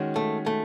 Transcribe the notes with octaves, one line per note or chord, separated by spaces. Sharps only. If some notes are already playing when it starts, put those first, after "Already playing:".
Already playing: D#3 G#3 C#4 F#4
A3
A3